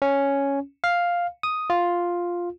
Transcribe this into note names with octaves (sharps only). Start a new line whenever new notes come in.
C#4
F5
D#6
F4